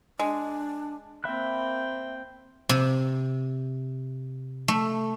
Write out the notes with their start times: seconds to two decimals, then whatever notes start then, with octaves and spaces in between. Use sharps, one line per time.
0.19 G#3 D4
1.24 A#3 C4 E5 G5 B5 F#6
2.69 C3
4.68 A3